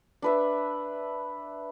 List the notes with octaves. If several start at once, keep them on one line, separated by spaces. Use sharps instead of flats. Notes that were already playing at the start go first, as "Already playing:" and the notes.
D4 B4 E5